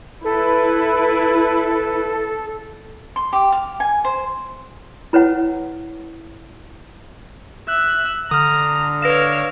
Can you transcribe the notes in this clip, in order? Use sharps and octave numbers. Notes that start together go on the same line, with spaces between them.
E4 A4 B4
C6
G4
F5
G#5
C5
E4 B4 C#5 F#5
E5 F#6
D3 A#5 D#6 F6
B4 C#5 F5 A#6 E7